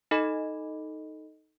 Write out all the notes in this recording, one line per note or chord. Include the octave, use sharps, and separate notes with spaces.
D#4 A4 D#5 B5